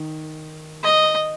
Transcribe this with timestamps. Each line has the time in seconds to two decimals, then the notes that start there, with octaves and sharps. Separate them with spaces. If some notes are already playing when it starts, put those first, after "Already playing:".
Already playing: D#3
0.83 D#5